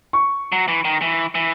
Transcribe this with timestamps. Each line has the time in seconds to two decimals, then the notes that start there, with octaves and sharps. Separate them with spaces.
0.13 C#6
0.52 F#3
0.68 E3
0.85 D#3
1.02 E3
1.35 E3